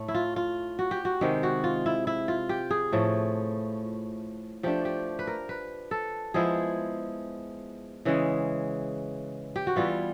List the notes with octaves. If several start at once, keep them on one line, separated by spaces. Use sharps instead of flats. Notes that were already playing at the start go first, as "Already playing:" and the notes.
Already playing: A2 A3
E4
F4
F4
F#4
G4
F#4
C3 D#3 G#3 G4
F#4
F4
E4
E4
F4
G4
G#4
A2 F3 A3
F3 A3 D4 G4
G4
B4
A#4
B4
A4
F3 G#3 B3 E4 G#4
C#3 E3 G#3
G4
F#4
E3 G3 B3 E4 F4